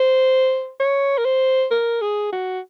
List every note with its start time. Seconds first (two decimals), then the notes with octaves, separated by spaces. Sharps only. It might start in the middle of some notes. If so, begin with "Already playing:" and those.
Already playing: C5
0.80 C#5
1.18 A#4
1.25 C5
1.71 A#4
2.01 G#4
2.32 F#4